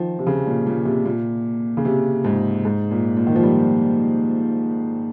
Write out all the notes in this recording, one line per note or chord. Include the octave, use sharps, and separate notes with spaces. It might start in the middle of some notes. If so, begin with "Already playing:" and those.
Already playing: D#3 F3
C3
C#3
A#2
A#2
C3
A#2
C#3
C3
G#2
G#2
A#2
A#2
D#3
F3
G3